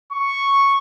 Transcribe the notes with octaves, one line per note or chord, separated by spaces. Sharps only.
C#6